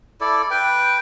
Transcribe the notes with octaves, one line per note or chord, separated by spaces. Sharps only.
E4 A4 D5
B4 G5